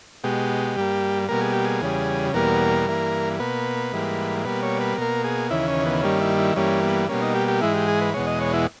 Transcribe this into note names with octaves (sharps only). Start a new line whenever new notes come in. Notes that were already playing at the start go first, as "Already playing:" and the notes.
B2 G#3 G4
G2 G3 A#3
B2 G3 A#3 A#4
G#4
G4
G#4
E2 C#3 G3
E2 B2 G3 A#3 A#4
G2 E3 A#3
B2 A#3 B4
G#2 E3 G3 A#3
B2 G3 A#3 B4
C#5
B4
B2 A#3 A#4
G#4
D#2 C#3 E3 E4
C#4
B3
G2 D#3 G3 A#3 C#4
E4
E4
G2 E3 G3 A#3 C#4
B3
B2 G3 A#3 C#4
D#4
G4
G4
G#2 E3 G#3 E4
G4
G#4
B4
E2 B2 G#3 C#5
D#5
C#5
E4